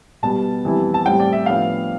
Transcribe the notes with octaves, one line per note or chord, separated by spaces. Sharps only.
B2 G3 B3 A5
F2 E3 G3 B3 E4
A5
A2 G3 C4 E4 G5
D5
E5
A2 F3 B3 D4 F5